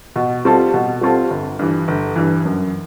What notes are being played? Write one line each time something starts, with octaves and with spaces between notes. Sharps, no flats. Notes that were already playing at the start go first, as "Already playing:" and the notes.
B2
G3 C4 F4 A4
B2
G3 C4 F4 A4
G1
G2 E3
G1
G2 E3
F#2